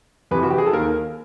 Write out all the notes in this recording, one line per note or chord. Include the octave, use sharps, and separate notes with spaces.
F2 C3 E3 B4
F#4
G4
G#4
A4
D#2 A#4